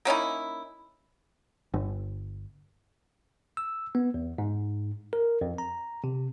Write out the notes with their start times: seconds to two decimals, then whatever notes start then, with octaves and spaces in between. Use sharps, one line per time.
0.05 A#3 C#4 D#4 E4
1.74 G1
3.57 E6
3.95 B3
4.14 E2
4.38 G#2
5.13 A#4
5.41 F2
5.58 A#5
6.04 C3